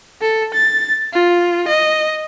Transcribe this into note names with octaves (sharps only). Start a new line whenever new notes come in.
A4
A6
F4
D#5